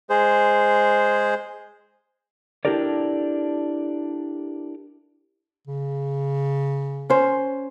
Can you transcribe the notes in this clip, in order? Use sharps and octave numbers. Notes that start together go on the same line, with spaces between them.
G#3 G#4 C5
D4 E4 G4 A4 A#4 D5
C#3
C#4 C5